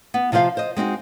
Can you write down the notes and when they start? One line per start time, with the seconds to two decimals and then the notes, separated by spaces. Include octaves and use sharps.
0.14 B3
0.32 C3 F3 F4 C5 F5
0.57 C5 D#5
0.76 G#3 C4 D#4 F#4